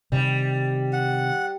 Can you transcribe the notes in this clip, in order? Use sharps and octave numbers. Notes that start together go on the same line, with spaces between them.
C3 D#3 G3
F#5